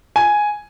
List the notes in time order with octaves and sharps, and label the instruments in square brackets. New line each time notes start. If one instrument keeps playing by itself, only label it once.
[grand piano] G#5